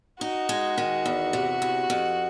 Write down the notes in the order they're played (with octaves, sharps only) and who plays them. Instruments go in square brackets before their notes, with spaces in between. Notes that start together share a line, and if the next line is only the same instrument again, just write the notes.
[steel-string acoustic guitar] D#4 [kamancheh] F#4
[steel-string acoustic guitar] G#3
D#3
E2
C3
E2
F2